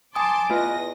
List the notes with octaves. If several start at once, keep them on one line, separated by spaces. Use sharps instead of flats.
G#5 A5 C6 D6 D#6
E2 F4 B4 D#5 A#6